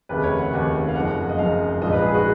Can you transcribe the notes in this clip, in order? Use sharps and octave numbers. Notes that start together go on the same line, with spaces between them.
F1 D#2 C#3 B4
C#5
F#5
F1 D#2 C#3 F#5
F5
F#1 F#2 F3 F#5
D#5
F#1 F#2 F3 F5
A#1 G#2 F3 D#5
B4
G#4
F#4